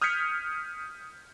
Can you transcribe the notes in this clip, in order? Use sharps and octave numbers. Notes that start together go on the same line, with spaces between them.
D#6 F6 G6 G#6 B6 C#7